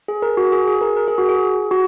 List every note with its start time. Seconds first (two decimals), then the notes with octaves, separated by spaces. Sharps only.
0.08 G#4
0.22 A#4
0.37 F#4
0.52 G#4
0.68 G#4
0.81 A#4
0.97 A#4
1.08 G#4
1.18 F#4
1.29 G#4
1.71 F#4